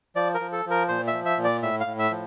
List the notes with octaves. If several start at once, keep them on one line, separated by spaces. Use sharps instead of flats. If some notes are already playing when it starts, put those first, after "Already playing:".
F3 D5
A#4
F3
A4
F3
A#4
A#2 C5
E5
F3
E5
A#2
D5
A2 E5
F5
A2
E5
F3